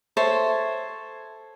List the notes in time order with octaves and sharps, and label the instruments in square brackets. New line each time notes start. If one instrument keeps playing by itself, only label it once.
[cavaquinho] A4 C5 C#5 E5